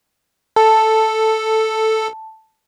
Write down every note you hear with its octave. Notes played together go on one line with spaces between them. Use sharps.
A4 A5